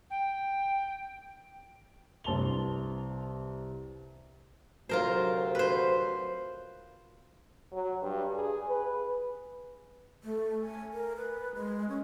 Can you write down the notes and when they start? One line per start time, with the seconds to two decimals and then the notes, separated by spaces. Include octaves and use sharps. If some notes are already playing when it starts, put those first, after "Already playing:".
0.10 G5
2.24 C2 B4 A5 C6 F7 G7
4.89 D2 C3 F#3 F4 A#4 C5
5.55 B4 C5
7.72 F#3
8.02 G2
8.35 G#4
8.68 B4
10.22 A3
10.62 G#5
10.93 A#4
11.16 B4
11.55 G#3
11.89 C#4